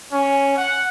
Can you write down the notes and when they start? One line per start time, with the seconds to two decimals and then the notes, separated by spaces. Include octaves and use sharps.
0.12 C#4
0.56 F#5